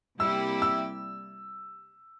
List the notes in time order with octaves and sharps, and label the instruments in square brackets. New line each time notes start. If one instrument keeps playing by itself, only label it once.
[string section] C3 G3 A#3 E4 G4 [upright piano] E6
[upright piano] E6